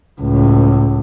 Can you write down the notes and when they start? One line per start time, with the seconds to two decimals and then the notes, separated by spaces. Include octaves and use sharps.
0.21 C#2 A2